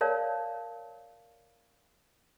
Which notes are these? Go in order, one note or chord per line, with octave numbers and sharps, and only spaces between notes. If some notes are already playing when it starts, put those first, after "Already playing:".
A#4 C#5 D5 F5 A5